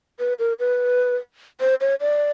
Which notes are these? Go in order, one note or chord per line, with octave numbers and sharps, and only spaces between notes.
B4
A#4
B4
C5
C#5
D5